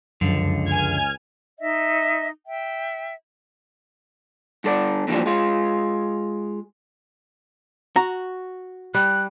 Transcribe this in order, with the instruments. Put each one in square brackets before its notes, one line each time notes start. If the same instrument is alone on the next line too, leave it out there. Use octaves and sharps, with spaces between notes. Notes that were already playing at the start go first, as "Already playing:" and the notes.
[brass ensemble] C#2 [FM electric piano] F#2 [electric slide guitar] D3 F3
[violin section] G#5 F6 G#6
[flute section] D#4 D#5 E5
E5 G5
[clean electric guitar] G2 D3 A4 D5
F2 A#2 D3 E3 F3 G3
G#3 F4
[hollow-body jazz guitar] F#4 [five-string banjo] A#5
[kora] G3 [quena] F#6